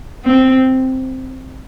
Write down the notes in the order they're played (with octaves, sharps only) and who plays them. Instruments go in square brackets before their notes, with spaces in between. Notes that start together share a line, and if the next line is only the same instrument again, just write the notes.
[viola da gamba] C4